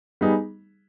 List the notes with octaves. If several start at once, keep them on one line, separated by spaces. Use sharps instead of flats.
G3 B3 D#4 G#4